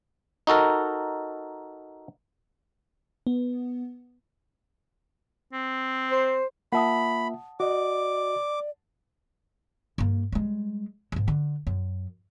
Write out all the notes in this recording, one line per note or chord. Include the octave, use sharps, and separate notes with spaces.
D#4 F#4 A4 A#4
B3
C4
C5
A#3 F4 E5 F#5 A5 B5 D#6
F#4 D5 D#5 D6
G2 A#3
G3 G#3
G#2 G#3
D3
F#2